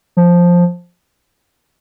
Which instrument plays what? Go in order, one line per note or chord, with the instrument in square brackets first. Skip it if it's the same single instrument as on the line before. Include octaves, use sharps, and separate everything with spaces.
[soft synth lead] F3